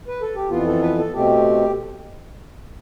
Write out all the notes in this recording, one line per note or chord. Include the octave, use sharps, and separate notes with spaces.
B4
A4
G4
F2 E3 B3 F4
A4
B4
A4
B2 A3 C4 G4